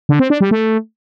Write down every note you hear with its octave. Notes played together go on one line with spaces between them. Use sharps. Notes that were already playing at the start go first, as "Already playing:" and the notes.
D3
C4
D4
G3
A3